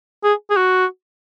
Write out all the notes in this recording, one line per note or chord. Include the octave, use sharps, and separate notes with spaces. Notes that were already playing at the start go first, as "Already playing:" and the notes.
G#4
G#4
F#4